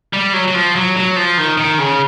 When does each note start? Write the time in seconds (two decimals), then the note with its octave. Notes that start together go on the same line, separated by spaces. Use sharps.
0.13 G3
0.33 F#3
0.48 F#3
0.54 F3
0.76 F#3
0.97 F#3
1.16 F3
1.38 D#3
1.58 D#3
1.78 C#3